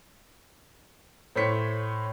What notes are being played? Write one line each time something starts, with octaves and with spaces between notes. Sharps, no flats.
A2 C5 C#5 B6 C#7